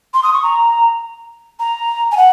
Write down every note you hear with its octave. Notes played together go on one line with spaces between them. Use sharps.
C6
D#6
C#6
A#5
A#5
G#5
F#5